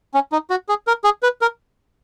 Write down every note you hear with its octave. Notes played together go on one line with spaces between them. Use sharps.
C#4
D#4
F#4
G#4
A#4
G#4
B4
A#4